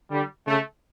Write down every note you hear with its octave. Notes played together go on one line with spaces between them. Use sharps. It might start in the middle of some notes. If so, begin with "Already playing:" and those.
D3 G3
C#3 A3